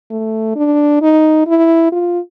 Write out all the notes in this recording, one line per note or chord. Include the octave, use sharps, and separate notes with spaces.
A3
D4
D#4
E4
F4